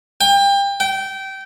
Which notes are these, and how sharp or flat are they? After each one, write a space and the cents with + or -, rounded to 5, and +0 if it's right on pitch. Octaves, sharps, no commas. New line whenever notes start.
G5 +30
G5 -20